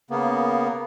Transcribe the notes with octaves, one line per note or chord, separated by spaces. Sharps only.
C#3 A#3 B3